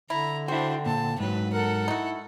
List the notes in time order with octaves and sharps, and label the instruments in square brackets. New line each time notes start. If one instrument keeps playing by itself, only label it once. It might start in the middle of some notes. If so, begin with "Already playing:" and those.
[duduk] D3 [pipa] E4 [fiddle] A#5
[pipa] C4 [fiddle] D4 C5 [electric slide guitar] E4 F#4
[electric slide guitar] A#2 [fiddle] A5
[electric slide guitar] G#2 F#3 [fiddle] B4
[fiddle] A4 F#5 [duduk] A#4
[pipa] D#4 F#4 [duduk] E4